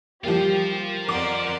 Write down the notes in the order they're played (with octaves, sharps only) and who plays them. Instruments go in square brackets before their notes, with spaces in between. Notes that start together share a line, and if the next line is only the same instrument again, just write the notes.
[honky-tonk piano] F3 G3 A#3 [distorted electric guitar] F4 C5 [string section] G4
[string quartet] F2 D5 C6 [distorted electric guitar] F3 C5 [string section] A#4 F#5 [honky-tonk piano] D6